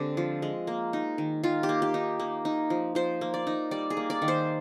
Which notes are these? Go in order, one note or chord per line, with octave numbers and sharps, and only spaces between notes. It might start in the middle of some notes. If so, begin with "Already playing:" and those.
Already playing: D3 G#3 C4 G4
F3
G#3
A#3
D#4
D#3
D#3 F4
G4
A#3
G4
D#4
A#3
D#4
F3
F3 C5
A#3
D5
D#4
G3 D5
G#4
A#3
D5
D#3
C5